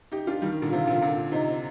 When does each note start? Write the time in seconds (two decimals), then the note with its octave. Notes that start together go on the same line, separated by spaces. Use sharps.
0.12 D#4 G4
0.27 D4 F4
0.42 D#3 G3
0.52 D#3
0.62 A#2 D3
0.72 C3 F4
0.87 A#2 D3
1.02 A#2 D3
1.32 C3 D#4